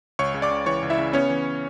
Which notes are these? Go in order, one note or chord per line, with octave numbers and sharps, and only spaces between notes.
C#2 C#5 C#6
C#3
D5 D6
C#2
E3 C#5 C#6
C#2
E4 E5
C#3
B3 C#4 C#5
E3